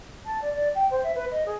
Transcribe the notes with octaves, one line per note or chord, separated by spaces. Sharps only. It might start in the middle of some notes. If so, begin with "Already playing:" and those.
A5
D5
D5
G5
C5
E5
B4
D#5
G#4